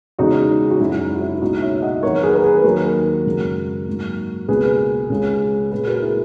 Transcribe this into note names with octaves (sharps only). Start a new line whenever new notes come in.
E2 C#3 G#3 D#4 F#4
F#4
F#2 C#3 G#3 E4
E4
D#4
F#4
E4
E4
C#2 B2 A#3 D#4 F#4
C#5 E5
D#5 F#5
E2 D#3 F#3 A#3 A#4 C#5
G#4 B4
A#4
G#4 B4
D#2 D#3 F#3 A#3 F#4 A#4
F#2 C#3 G#3
G#2 F#3 A#3
C#2 B2 A#3 G#4 B4
C#2 C#3 G#3
A#2 G#3 G#4 B4
F#4 A#4
E4 G#4